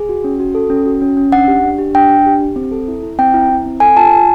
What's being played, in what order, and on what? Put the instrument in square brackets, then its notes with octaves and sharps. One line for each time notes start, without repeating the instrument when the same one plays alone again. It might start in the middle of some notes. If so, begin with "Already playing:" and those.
Already playing: [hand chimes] G#4
F#4
C#4
F#4
A4
C#4
F#4
C#4
C#4
D4 F#5
G4
D4
G4
D4 G5
D4
G4
G4
C4
A4
E4
E4
C4 G5
E4
E4
C4
A4 G#5
F4 A5
F4 G#5